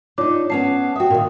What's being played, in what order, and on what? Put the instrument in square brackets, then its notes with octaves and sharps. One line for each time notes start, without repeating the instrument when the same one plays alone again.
[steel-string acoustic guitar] D4 D#4 [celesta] F4 C#5 D6
[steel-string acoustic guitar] B3 C#4 A5 [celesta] C7
[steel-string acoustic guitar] F#4 E5 [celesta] G5 D#6
[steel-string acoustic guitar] A#2 D#3